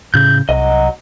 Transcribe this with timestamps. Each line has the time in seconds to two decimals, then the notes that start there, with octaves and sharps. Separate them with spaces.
0.14 A2 C#3 G6
0.49 C2 F#3 D#5